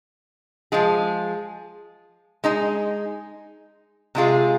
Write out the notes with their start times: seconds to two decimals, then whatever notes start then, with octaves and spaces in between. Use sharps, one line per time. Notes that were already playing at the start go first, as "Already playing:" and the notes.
0.72 F3 G#3 F4 G#4
2.44 G#3 D#4 G#4
4.15 C3 G#3 F4 G#4